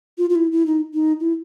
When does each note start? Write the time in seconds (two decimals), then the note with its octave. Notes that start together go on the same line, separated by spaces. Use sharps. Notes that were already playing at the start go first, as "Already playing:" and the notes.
0.18 F4
0.30 F4
0.35 E4
0.52 E4
0.66 D#4
0.94 D#4
1.20 E4